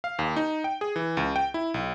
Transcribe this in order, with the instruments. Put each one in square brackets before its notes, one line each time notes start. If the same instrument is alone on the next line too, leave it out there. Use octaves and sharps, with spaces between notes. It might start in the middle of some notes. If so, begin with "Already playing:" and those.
[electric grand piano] F5
D#2
D#4
G5
G#4
E3
C#2
G5
E4
B1